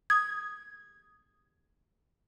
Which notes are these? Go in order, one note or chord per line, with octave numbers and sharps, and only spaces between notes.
D#6 G#6